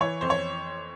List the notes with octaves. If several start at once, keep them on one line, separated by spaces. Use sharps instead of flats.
E3 C#5
F2 C5
C#5